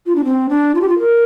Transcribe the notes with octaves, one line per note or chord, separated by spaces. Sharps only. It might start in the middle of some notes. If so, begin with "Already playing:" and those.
F4
D4
C4
D4
F4
G4
F4
A#4